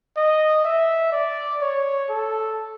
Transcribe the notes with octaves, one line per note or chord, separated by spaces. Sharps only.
D#5
E5
D5
C#5
A4